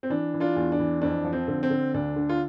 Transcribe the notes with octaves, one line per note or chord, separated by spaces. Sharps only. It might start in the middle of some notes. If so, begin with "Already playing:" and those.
C4
E3 D4
E3
D4 F4
E2
D4
E3
F2 D4
F3
C4
D3
C4
D3
D2 D4
D3
F4